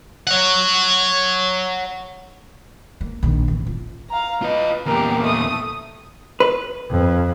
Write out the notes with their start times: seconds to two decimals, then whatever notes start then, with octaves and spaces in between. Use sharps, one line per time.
0.27 C#5 F#5
3.01 A#3
3.23 A#1 D#3
3.48 A1
3.67 F4
4.10 F5 A#5
4.42 F4 B4 D#5
4.86 E2 A#2 G4 A#4
5.23 A3 D#6
6.40 B4
6.90 F2